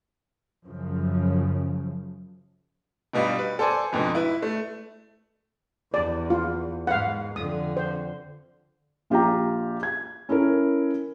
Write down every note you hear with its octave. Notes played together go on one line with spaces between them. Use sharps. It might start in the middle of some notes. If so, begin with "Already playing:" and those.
F#2 C#3 F3
G2 B2 G3 D#4 F4
B4
A4 C5 D5 G#5
F2 G#2 B2 D3
E4 B4
A3
E2 D5
F4
G#2 F5 F#5
F2 D3 D#6
C5
A#1 F4 G4 G5 A#5
G#6
C#4 E4 A4 A#4